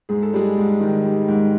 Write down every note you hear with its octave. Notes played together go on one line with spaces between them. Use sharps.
G#2 G#4
A4
G3 G#3 G#4
G#2
D#3
G3
G#2